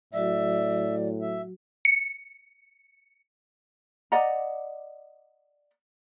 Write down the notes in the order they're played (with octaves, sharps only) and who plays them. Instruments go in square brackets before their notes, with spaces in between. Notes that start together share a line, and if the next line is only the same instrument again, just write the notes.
[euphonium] A2 [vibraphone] F#3 F#4 [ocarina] D5 [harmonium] E5
[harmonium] E5
[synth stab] C#7
[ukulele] D5 D#5 F#5 A#5